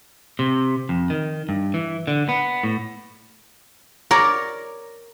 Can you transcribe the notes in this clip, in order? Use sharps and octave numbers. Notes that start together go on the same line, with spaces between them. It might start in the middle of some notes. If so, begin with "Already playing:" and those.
C3
F2
D#3
G2
E3
D3
B3
A2
A#4 C#5 D5 A#5